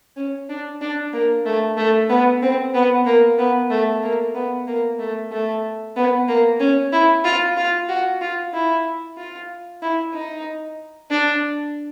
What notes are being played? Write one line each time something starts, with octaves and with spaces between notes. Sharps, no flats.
C#4
D4
D4
A#3
A3
A3
B3
C4
B3
A#3
B3
A3
A#3
B3
A#3
A3
A3
B3
A#3
C#4
E4
F4
F4
F#4
F4
E4
F4
E4
D#4
D4